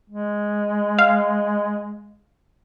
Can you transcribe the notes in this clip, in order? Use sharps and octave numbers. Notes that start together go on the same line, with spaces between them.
G#3
F5